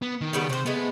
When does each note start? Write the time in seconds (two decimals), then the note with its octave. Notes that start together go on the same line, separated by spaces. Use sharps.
0.02 B3
0.21 D#3
0.33 C#3 G3 B3
0.50 C3 C5 C#5
0.66 G#3 A3 B3